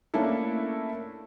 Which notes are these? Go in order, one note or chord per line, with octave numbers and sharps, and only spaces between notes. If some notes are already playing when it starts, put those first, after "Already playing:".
A3 A#3 C#4 D4 E4 A4